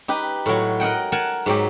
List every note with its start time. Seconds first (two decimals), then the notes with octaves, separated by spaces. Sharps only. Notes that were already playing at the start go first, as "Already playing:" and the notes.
0.08 D#4 G4 B4
0.46 A2 F#3
0.80 A#4 D#5 F#5 G5
1.12 A#4 F#5 G#5 A5
1.46 G#2 F#3 G4